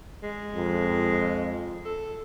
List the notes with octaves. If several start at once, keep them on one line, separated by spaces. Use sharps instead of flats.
G#3
F2
A4